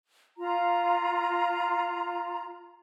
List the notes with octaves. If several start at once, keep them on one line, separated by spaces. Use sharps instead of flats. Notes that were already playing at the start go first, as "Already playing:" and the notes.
F4 A#5